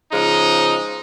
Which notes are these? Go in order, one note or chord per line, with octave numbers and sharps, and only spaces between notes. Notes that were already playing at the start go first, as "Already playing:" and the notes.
C#3 F3 G#3 D#4